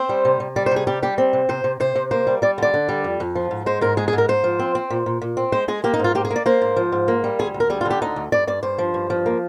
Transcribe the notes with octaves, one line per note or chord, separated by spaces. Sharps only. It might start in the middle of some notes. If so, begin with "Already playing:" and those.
Already playing: C4 C5
G3
C3
C3
G3 D5
C5
C3
G#4
G3 G4
G3 G4
C4
C3
C3 C5
C3
C3 C5
C3
A#3 C5
G3
G3 D5
D3 D5
D3
G3
F2
F2
F3
G#2
G#3 C5
G#2 A#4
G#3 G#4
G#4
G#2
A#4
G#2 C5
F3
C4
C4
A#2
A#2
A#2
C4
G#3 C5
G#3 G#4
A#3 G4
D#4
G#2
F4
A#3 G4
G#4
A#3
D5
A#3 C5
G#2
F3
G#2
A#3
G3
D2 G#4
D2
A#4
G3 G#4
F4
D3 G4
D2 D#4
D2
G2 D5
G2 D5
G2 C5
F3
G2
F3
A#3